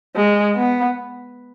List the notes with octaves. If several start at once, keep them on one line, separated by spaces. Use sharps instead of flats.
G#3
B3